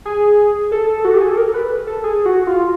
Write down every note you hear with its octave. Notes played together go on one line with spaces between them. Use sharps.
G#4
A4
F#4
G4
G#4
A4
A#4
B4
A4
G#4
F#4
F4